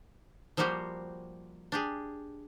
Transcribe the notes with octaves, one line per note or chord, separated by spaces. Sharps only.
F3 G3 A#3 F#4 G4 C5
D4 G4 G#4